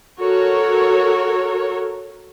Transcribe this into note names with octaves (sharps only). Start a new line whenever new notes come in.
F#4 A4 A#4 C#5